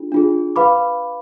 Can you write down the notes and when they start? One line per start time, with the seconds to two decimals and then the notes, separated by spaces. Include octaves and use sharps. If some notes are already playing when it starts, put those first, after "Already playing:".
Already playing: D4 F4 G#4
0.12 D4 F4 G#4
0.56 B4 F5 B5 D6